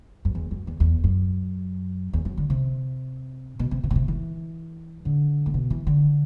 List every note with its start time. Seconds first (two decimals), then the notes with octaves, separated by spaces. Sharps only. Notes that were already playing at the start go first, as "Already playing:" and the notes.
0.25 F#2
0.35 E2
0.51 F#2
0.67 E2
0.80 E2
1.04 F#2
2.13 E2
2.25 F#2
2.37 D3
2.50 C3
3.59 B2
3.71 C3
3.84 C3
3.90 B2
3.95 C3
4.08 E3
5.05 D3
5.46 A2
5.54 B2
5.70 E3
5.87 D3